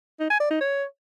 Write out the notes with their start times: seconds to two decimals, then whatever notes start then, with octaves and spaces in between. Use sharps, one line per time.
0.20 D#4
0.30 G#5
0.40 D5
0.50 D#4
0.61 C#5